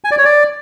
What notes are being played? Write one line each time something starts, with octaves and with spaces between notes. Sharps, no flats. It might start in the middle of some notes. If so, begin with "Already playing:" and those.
G#5
D5
C#5
D5